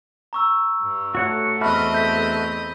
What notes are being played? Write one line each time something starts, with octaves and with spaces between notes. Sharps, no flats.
A#5 C#6 E6
G2
A3 F#4 C#5 F#5
E2 C4 F#4 D#5 E5 A5 B5 F6
G6 B6